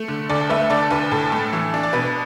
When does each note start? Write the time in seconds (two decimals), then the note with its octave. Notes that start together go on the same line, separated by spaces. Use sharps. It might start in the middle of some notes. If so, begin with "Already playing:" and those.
Already playing: A3
0.08 D3
0.29 D2 A4 D5
0.50 A3 B4 E5
0.70 D3 A4 D5
0.91 D2 B4
1.11 A2 A4
1.32 A3
1.53 E3
1.74 D4
1.83 D5
1.93 B2 B4